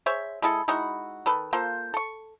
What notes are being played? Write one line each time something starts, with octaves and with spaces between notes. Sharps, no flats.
G#4 C5 C#5 E5
G#3 E4 G#4 A4
G#3 D#4 E4 F#4
D#3 A4 B4
A#3 F4 A4 C5
A4 C#6